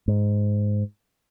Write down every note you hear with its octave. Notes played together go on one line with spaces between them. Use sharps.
G#2